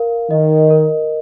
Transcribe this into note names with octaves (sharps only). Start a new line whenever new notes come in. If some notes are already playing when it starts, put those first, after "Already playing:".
Already playing: A#4 F5
D#3 D#5
A#4